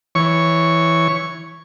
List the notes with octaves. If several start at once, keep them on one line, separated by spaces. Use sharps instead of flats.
E3 C#5 C#6